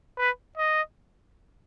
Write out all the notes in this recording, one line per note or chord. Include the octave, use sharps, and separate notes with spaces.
B4
D#5